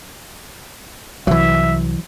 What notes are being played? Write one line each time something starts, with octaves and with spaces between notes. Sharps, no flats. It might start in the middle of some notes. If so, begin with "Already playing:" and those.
C2 E3 F#3 E5